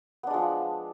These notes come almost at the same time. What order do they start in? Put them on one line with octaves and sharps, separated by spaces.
B3 D4 G#3 F3